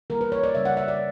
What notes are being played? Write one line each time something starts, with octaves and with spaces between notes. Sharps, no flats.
E3 G3 A#3 A#4
B4
C#5
D5
C#3 G3 C#4 E5
F#5
E5
D5